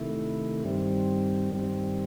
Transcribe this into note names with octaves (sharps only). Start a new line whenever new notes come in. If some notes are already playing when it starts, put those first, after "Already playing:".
Already playing: C3 D#3 A3 E4
G2 D#3 G3 C4
G2 D#3 G3 C4